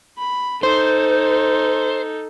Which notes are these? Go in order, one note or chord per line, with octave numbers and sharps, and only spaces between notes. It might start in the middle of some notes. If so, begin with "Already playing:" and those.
B5
D#4 A4 C5